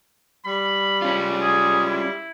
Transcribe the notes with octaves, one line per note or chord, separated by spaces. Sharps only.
G3 B5
C#4 F4
G#4
E4